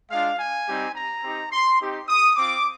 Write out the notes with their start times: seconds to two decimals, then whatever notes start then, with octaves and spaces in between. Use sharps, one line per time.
0.11 G#3 D4 F4 F5
0.39 G#5
0.67 G3 C4 D#4 G4
0.96 A#5
1.24 C4 D#4 G4
1.52 C6
1.81 C4 D#4 G4
2.08 D#6
2.37 C4 F4 D6